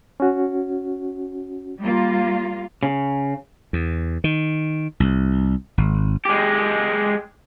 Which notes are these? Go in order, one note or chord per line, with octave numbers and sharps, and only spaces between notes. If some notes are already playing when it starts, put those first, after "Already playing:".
C#4 F#4
G3 A#3 F4
C#3
E2
D#3
C2
G#1
G#3 G4